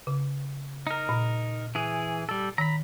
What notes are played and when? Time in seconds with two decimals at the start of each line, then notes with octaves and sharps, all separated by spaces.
0.07 C#3
0.87 D#4 A#4
1.09 A#2
1.75 E3 G#4
2.29 G3 A4
2.58 D#3 A#5 B5